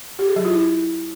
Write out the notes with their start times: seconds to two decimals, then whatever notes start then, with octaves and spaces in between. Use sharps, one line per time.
0.19 G4
0.28 G#4
0.36 F#3
0.45 F4
0.53 E4